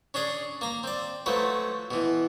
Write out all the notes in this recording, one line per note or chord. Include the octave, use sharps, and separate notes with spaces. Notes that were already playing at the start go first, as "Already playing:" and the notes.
C#4 D4 G#4 D5
A#3 A#5
C4 D5
F3 F#3 A3 B4
B2 E3